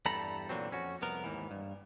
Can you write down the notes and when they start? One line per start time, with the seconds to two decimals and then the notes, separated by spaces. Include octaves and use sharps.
0.06 E2 G2 G3 A4 A#5 B5
0.49 A#2 D3 E3 F#3 C4
0.71 F2 C#4 F#4
1.02 C2 F2 B3 A#4
1.24 D#2 G#2 E3
1.51 G2